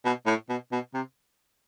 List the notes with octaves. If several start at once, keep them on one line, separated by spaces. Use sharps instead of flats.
B2
A2
B2
B2
C3